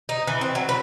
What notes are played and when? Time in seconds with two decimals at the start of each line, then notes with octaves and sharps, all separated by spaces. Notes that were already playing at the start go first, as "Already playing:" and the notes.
0.09 D#4
0.27 E3
0.41 C4
0.55 F#3
0.69 B4